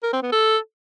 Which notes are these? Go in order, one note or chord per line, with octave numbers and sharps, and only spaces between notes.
A#4
C4
B3
A4